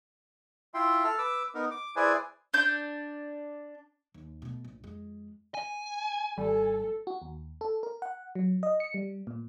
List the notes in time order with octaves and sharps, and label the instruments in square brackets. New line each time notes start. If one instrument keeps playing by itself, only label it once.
[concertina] E4 F4 E5 G5 C6
A4 A5 F6
B4 D6 E6
B3 D#4 A#4
D6
E4 G#4 B4 C5 D5 G#5
[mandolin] D4 G6
[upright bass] D#2
B2 A3
A#1
F2 G#3
[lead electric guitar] G#5
[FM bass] G#1 [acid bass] G3 [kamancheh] A4
[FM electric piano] F#4
D#2
A4
A#4
F#5
F#3
D#5
C#7
G3
A#2